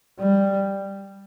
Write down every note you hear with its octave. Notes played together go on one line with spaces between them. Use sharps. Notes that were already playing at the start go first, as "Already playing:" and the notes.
G3